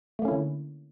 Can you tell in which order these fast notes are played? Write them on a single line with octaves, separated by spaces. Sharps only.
A3 A#3 C#4 E4 D3